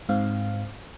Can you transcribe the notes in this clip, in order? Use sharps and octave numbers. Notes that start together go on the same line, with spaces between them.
G#2 C4 F5